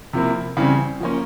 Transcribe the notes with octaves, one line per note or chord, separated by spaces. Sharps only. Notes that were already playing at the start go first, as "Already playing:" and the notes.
C3 F3 A#3 E4
C#3 E3 G3 C4
F3 A#3 C#4